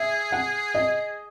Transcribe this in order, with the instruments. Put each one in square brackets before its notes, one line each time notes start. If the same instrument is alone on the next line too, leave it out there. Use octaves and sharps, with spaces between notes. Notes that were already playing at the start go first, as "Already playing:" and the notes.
Already playing: [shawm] G#4 [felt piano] E5
[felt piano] F#5
D#5